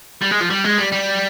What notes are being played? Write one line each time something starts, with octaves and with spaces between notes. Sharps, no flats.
G3
G#3
F3
G3
G#3
G3
G3